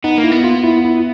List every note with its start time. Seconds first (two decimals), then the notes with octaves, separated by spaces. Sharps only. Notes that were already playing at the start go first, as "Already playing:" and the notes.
0.04 B3 D#4
0.18 A#3
0.24 E4
0.31 B3
0.44 F4
0.64 E4
0.85 E4